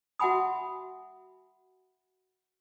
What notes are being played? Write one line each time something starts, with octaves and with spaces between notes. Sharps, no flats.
F#4 E5 F#5 G#5 B5 D#6